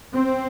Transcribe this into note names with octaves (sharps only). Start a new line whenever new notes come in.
C4